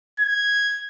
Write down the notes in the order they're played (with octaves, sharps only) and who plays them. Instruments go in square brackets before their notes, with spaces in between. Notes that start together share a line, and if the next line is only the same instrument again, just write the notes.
[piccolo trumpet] G#6